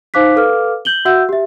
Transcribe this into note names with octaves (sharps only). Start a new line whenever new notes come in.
D#4 C5 F5 D6 F#6 B6
A4 B4 F5 D6 F6
G6 F#7 G7
F#4 E5 F#5 E6 G6
G4 E5